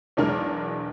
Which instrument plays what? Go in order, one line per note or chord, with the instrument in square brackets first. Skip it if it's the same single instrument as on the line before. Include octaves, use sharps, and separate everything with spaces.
[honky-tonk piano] B1 E2 G#3 D4 A#4 F6